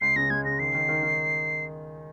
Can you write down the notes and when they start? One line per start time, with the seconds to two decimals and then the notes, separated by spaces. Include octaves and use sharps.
0.01 C#2 C7
0.16 C#3 A#6
0.30 G#3 G#6
0.45 C#3 A#6
0.59 D#3 C7
0.74 D#3
0.89 D#3
1.03 D#3